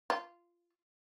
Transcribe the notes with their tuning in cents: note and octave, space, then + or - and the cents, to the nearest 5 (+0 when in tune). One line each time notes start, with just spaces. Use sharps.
F4 -15